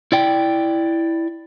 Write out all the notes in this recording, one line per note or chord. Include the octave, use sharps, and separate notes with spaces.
E4 D5 G5